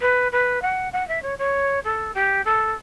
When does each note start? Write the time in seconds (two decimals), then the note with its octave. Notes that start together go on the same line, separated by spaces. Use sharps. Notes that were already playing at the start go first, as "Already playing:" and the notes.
0.01 B4
0.32 B4
0.62 F#5
0.93 F#5
1.08 E5
1.23 C#5
1.39 C#5
1.84 A4
2.14 G4
2.45 A4